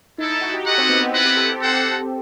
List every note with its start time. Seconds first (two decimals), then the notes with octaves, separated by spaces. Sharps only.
0.18 A3 D#4 E4 A4
0.30 D#4
0.41 F#4
0.54 G4
0.65 E4 G4 A4 D#5 F#5
0.78 C4
0.89 B3
1.01 B3
1.13 B3 C4 E4 B4 D#5 F#5
1.25 G4
1.37 A4
1.48 G4
1.61 D#4 A4 C5 F#5